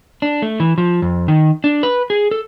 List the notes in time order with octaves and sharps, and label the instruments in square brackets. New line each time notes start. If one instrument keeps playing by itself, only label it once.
[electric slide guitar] D4
A3
E3
F3
F2
D#3
D4
B4
G#4
A4